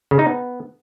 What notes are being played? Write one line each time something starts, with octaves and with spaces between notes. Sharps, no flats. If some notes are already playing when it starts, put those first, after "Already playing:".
C#3
D#4
B3